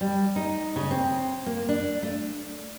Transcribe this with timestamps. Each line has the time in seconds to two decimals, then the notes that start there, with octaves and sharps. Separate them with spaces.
0.01 G3
0.36 D#4
0.76 C#3
0.91 C4
1.46 A#3
1.69 D4
2.03 A3